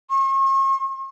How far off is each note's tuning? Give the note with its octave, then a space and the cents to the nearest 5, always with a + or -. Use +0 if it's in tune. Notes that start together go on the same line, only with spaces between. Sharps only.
C#6 -45